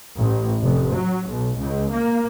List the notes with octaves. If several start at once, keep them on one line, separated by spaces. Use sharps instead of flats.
A1
F1
F#3
B1
C#2
A#3